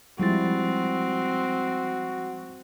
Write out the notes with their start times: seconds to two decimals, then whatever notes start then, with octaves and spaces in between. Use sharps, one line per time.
0.20 F3 G3 G#3 C4 E4 F#4 A6